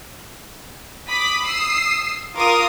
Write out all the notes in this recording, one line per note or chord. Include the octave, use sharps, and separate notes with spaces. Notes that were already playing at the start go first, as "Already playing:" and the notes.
B5 D6 D#6 B6
D#6 E6 C7
F4 A#4 F5 D6 D#6